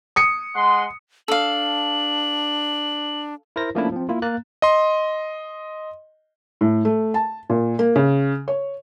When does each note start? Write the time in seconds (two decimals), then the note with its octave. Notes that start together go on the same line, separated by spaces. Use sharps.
0.16 D#6 C#7
0.55 G#3 F#5 C6
1.28 D4 A4 F5 F#7
3.56 E4 A#4 C5 A#6
3.75 F3 A3 A#3 C#4 D4 E4
3.92 F3 C4
4.09 A#3 E4 F4
4.22 A#3 A#5 F#6 A6
4.62 D#5 C6
6.61 A2
6.85 A3
7.14 A5
7.50 A#2
7.79 A#3
7.96 C#3
8.48 C#5